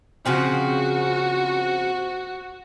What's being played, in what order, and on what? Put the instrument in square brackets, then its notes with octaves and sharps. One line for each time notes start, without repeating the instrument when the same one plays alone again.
[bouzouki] C#3 F3 C4 [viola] F#4